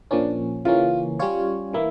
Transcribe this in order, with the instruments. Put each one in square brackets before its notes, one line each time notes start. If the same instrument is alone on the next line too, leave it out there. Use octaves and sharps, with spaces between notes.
[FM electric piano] A#2 F3 A#3 C#4 [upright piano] D4
[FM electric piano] C#3 E3 A#3 C#4 [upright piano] F4
[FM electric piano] G3 C#4 F4 C#5
[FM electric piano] E3 A#3 [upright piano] E4